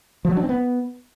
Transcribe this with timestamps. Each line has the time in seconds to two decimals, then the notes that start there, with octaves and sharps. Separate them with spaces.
0.25 F3
0.31 F#3
0.37 D4
0.43 C4
0.49 B3